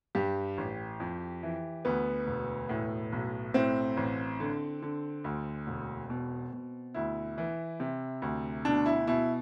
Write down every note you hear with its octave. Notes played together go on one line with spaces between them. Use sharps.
G2 G4
A1
F2
E3
D2 B3
E1
A2
B1
A2 C4
A1
D3
D3
D2
E1
B2
B2
D2 E4
E3
C3
D2
B2 D4
E4
B2 E4